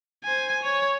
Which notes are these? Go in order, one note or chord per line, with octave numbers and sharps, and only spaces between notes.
C5 G#5
C#5